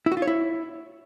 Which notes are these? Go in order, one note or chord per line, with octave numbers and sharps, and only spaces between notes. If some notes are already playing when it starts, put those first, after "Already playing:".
E4
F#4
F4
C#5
E4